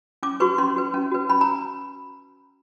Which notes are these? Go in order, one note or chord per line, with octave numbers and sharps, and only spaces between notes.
C#4 D6
F#4 B4 C#6
C#4 C6
F#4 B4
C#4
F#4 B4
C#4 B5
A#5